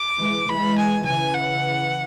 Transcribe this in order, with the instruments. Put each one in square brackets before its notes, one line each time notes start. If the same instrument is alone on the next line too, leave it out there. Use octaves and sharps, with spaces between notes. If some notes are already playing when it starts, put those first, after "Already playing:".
Already playing: [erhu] D6
[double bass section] E3 G#3
[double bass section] E3 G#3 [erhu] B5
[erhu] G#5
[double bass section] C#3 E3 [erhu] G#5
[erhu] F#5